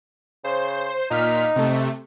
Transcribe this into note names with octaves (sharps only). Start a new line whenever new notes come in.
C#3 C5
A#2 D#4 F6 B6
C3 A3